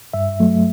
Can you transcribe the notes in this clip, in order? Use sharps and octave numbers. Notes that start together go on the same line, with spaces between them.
G2 E5
F#3 A3